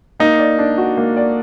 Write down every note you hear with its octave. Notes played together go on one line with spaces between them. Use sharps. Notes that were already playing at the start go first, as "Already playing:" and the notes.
A#3 D#4
D5
D4
F#4
A#3
D5